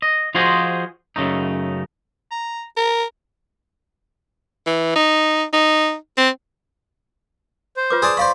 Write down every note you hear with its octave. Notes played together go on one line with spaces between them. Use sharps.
D#5
F3 F4 F#4 G#4 C5 D#5
F#2 C#3 A3 D#4
A#5
A#4
E3
D#4
D#4
C4
C5
F4 B4 D6
G#4 D5 A5 C6
C5 D5 F5 B5 C#6